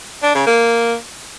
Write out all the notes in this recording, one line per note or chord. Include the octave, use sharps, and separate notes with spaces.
D4
C#3
A#3